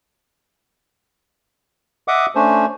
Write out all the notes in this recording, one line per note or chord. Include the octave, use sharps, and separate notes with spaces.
D#5 E5 F#5 D6 D#6
A3 C#4 D4 C5